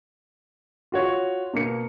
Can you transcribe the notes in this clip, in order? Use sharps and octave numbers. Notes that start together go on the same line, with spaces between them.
F4 F#4 C#5
B2 A#3 C#7